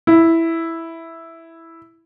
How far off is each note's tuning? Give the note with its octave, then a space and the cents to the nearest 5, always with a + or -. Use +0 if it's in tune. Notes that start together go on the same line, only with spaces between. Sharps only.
E4 +0